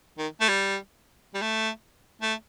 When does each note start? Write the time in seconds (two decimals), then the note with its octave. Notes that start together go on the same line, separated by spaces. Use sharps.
0.18 D#3
0.41 A3
0.49 G3
1.35 G3
1.42 A3
2.22 A3